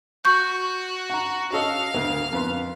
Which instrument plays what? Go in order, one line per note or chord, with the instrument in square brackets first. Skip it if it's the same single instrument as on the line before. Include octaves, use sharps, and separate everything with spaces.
[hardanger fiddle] F#4 [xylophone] C#6 G6
[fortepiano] F#5 A#5
[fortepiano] C#4 A4 D#5 [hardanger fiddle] F5
[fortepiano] D2 A#3
F2 B3 C6